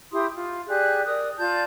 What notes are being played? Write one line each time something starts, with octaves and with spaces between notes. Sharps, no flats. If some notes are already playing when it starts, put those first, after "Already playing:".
E4 G4 C6 D#6
F4
G4 G#4 D5 F#6
A#4 D5 D#6
F4 D5 A5 G6